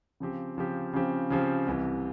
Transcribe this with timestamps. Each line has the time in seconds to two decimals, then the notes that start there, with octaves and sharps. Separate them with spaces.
0.20 C#3 F3 C4 G4
0.58 C#3 F3 C4 G4
0.93 C#3 F3 C4 G4
1.30 C#3 F3 C4 G4
1.67 C2 C3 E3